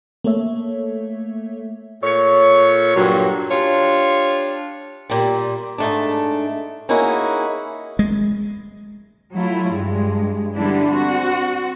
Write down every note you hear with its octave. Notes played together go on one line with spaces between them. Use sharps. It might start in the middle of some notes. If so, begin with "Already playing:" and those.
A3 A#3 A4 C#5 E5
A#2 A4 C#5
G2 A#2 F#3
D4 F4 G4 C#5
A#2 G3
G#2 A3 D4
A#3 C#4 D#4 E4 F#4 G#4
G#3
F#3 A3 E4 F4
G2 G#3
D3 G3 B3 D4 E4
C4 F#4